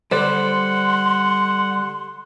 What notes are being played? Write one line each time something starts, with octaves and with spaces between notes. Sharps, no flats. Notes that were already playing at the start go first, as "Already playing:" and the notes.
D3 G3 C5 D5 F#5 C6